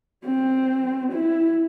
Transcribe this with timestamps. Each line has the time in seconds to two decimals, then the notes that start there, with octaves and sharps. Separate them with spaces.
0.25 C4
1.12 E4